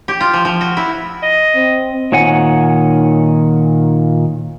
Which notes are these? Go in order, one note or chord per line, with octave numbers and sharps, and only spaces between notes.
G4
F4
F3
F3
F#4
E4
D#5
C4
A#2 D#3 C#5 F#5 G#5